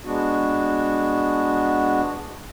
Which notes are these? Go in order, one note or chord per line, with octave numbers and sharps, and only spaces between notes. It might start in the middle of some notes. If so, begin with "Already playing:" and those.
G#3 B3 D4 F#4